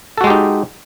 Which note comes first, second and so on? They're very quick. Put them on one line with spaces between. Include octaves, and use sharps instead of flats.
A4 F#4 G#3 G4 D#4